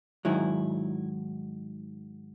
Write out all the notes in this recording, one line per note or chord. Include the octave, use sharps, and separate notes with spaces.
G#2 D#3 F#3 E4